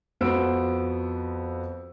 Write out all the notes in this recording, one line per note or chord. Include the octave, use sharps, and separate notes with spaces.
F2 B3 F#4 C5 E6 D7